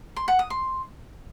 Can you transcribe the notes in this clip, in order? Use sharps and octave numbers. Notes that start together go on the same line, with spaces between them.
C6
F#5
D#6
C6